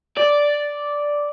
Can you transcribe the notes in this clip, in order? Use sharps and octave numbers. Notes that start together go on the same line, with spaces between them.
D5